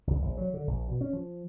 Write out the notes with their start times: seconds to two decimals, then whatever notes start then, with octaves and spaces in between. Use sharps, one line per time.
0.07 C#2
0.21 A#1
0.37 F#3
0.54 D3
0.67 A#1
0.88 B2
1.01 C#4
1.13 F3